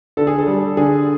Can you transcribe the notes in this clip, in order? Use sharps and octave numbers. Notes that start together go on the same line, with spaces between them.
D3 A4
G#4
A4
G3
D3 G#4